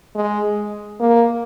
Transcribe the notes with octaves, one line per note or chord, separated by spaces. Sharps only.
G#3
A#3